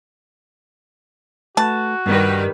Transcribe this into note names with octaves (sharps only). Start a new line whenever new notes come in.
A3 F#4 B4 A5
G2 D#3 G3 B4